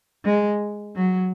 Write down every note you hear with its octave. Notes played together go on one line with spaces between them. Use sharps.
G#3
F#3